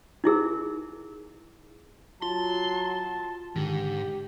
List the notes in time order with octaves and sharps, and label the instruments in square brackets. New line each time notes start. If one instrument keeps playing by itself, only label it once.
[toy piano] D#4 E4 G#4 A#4
[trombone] F#3 [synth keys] F4 [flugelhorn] A5 [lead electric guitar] C6
[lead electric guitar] G#2 [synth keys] D3 D#3 [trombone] G4